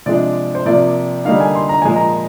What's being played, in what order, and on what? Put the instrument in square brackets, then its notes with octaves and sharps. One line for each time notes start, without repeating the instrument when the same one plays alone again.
[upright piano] C3 F3 G#3 D4 D5
C5
C3 F3 A#3 D5
D3 G3 A#3 D#4 F5
G#5
C6
A#5
A#2 F3 G#3 G#5
A#5